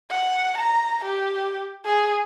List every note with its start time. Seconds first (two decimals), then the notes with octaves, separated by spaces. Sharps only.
0.10 F#5
0.58 A#5
1.05 G4
1.86 G#4